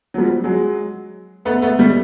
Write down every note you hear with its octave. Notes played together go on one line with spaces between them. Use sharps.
F#3
F3 G3
F#3 G#3
A3 B3
A3 B3
G3 A3